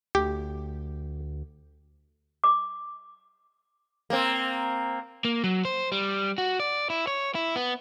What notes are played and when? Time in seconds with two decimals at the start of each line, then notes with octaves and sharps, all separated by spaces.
0.15 D2 G4
2.44 D6
4.10 A#3 C4
5.25 A#3
5.44 F#3
5.65 C5
5.92 G3
6.38 F#4
6.60 D5
6.90 E4
7.07 C#5
7.35 E4
7.56 B3